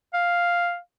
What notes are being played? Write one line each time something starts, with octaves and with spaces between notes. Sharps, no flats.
F5